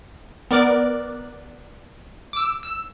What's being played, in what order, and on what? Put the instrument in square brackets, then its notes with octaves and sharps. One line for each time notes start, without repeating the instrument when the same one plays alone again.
[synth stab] B3 A#4 D5 D6 F#6
D6 E6
E6